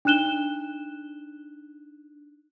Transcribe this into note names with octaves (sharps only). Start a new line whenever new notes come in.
D4 D#4 F#6 E7 G7